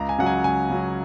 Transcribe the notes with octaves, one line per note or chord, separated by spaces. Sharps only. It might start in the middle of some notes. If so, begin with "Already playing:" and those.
Already playing: C#2 A#5
G#5
C#3 F#3 F#5
G#5
C#2 G#5
C#3 F#3